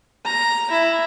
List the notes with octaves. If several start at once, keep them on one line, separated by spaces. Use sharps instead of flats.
A#5
E4